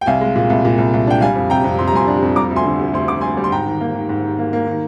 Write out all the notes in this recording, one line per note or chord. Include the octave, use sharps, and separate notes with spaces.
G5
C2 F5 G#5
G#3
A#2
C2
A#2
C2
C2
D4 G5
G3 F5 G#5
F2
C3 G5 A#5
F2
F2 C6
A#5
G3 G#5 C6
D4
F2
G3 A#5 D6
D2
G#5 C6
D3
D2
D2 C6
D3 D6
G3 G#5 C6
G3
C6
G#2 G5 A#5
D#3
A#3
D#3
G#2
D#3
A#3
A#3
D#3